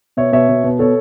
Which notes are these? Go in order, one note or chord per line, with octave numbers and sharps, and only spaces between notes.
B2 C#5 E5
B2 C#5 E5
B2
B2
B2 A4 C#5